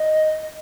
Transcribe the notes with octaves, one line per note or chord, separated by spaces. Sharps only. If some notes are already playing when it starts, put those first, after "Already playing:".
Already playing: D#5